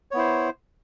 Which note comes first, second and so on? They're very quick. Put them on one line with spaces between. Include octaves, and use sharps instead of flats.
C#5 B3 E4 C5